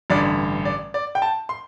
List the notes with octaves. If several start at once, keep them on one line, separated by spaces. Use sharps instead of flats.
A1 G2 D3 D5
D5
D5
G5
A5
C6